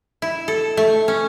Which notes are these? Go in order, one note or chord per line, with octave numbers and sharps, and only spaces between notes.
E4
A4
A3
C#4